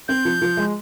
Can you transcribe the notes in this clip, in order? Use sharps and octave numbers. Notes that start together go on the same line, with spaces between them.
C4 G6
F3
F3
G#3